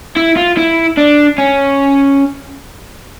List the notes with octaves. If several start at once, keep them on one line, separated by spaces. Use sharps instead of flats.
E4
F4
E4
D4
C#4